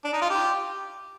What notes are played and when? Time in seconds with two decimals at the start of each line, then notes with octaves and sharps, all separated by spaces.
0.05 D4
0.13 D#4
0.22 F4
0.30 G4